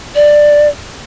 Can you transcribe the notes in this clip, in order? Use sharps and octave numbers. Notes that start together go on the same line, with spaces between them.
D5